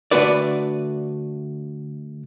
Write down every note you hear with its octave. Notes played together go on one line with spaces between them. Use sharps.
D3 A3 D4 F#4 B4 D5